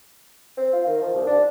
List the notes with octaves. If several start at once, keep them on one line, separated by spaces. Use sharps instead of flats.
C4
F4
D#3
F3
C2
D4